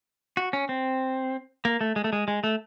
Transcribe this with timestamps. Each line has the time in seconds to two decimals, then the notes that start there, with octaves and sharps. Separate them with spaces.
0.37 F#4
0.53 C#4
0.69 C4
1.65 A#3
1.81 A3
1.96 G#3
2.04 A3
2.13 G#3
2.28 G#3
2.44 A3